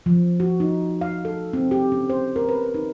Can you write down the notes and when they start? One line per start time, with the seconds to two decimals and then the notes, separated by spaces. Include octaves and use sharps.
0.06 F3
0.40 F#4
0.60 D#4
1.01 F5
1.25 A4
1.53 C4
1.71 G4
1.92 C#4
2.10 C5
2.36 A#4
2.49 B4
2.75 D#4